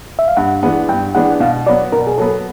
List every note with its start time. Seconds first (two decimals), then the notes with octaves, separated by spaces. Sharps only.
0.19 E5
0.28 F5
0.37 G2 F#5
0.63 E3 G#3 B3 D4 F#5
0.89 G2 G5
1.15 E3 G#3 B3 D4 F#5
1.40 B2 F5
1.66 F#3 B3 D5
1.92 B2 A#4
2.07 G#4
2.18 F#3 B3 A4